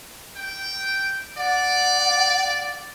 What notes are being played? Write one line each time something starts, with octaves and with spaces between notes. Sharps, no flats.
G5
D5 F#5